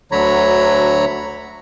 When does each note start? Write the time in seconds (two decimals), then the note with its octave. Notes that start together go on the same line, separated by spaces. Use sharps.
0.12 D2 D3 F#3 C#5 A#5 B5